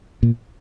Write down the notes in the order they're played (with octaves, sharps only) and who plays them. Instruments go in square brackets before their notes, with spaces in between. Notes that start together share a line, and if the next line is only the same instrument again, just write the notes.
[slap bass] A#2